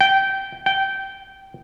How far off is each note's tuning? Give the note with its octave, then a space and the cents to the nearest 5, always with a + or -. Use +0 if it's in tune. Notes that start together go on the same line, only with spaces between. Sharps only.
G5 -15
G5 -15